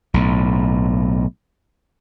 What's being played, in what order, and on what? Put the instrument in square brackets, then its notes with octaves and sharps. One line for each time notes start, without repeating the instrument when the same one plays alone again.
[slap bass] B1 A2